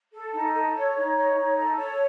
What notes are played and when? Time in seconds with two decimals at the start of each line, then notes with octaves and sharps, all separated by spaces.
0.13 A4
0.33 D#4
0.53 A4
0.74 C#5
0.95 D#4
1.15 C#5
1.36 D#4
1.56 A4
1.77 C#5